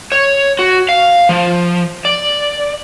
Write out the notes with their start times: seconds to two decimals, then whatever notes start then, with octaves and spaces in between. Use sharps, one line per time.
0.12 C#5
0.59 F#4
0.89 F5
1.29 F3
2.05 D5